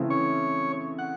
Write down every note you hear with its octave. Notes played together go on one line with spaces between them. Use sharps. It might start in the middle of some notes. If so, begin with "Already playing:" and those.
Already playing: C#3 E3 A3 C4 E4
C#5
F#5